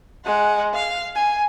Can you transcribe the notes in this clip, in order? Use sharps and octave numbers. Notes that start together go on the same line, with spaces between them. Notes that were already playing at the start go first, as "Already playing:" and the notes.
G#3 F#5
F5
G#5